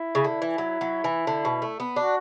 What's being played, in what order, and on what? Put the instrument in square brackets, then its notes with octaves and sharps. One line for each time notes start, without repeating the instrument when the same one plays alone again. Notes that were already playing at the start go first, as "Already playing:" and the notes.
Already playing: [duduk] E4
[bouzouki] C#3
D3
E3
F#3
F#3
E3
D3
B2
A3
B3
[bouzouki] D4 [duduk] F#4